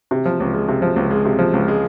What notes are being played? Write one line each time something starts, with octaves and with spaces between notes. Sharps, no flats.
C3
F3
C#2
G#3
C3
F3
C#2
G#3
C3
F3
C#2
G#3